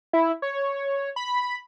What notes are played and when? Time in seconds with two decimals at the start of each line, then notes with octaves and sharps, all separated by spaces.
0.13 E4
0.42 C#5
1.16 B5